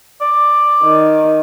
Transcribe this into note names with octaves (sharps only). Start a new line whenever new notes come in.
D5
D#3